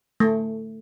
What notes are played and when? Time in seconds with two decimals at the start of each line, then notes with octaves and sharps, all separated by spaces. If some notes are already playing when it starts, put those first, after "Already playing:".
0.20 A3